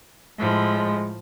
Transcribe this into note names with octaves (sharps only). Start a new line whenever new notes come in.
A2 F3 G#3